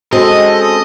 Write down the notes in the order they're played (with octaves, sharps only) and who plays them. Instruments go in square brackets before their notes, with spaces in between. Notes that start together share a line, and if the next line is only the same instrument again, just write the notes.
[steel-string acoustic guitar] G#3 C4 [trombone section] C#4 A4 [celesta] F#4 [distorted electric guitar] D#5